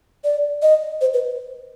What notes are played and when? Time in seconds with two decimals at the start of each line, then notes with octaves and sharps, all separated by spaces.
0.24 D5
0.62 D#5
1.01 C5
1.14 B4